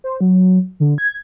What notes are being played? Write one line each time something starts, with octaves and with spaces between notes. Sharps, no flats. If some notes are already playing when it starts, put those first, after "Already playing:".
C5
F#3
D3
G#6